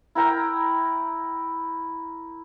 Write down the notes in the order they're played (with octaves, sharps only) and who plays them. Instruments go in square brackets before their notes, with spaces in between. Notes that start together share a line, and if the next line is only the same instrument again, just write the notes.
[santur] E4 A#4 G5 A#5